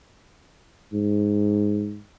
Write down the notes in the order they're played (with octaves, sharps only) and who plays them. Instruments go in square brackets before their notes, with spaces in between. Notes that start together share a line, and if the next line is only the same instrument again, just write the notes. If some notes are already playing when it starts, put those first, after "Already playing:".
[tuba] G#2